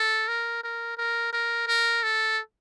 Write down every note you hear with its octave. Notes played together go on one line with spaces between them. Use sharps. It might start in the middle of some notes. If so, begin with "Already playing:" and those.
Already playing: A4
A#4
A#4
A#4
A#4
A#4
A4